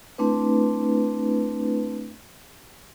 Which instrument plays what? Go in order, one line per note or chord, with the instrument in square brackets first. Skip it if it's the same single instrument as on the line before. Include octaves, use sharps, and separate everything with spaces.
[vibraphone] A3 C4 D4 E4 B4